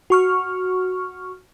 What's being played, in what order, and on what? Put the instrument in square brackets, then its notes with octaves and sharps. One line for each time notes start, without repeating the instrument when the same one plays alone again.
[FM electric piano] F#4 C#6 F6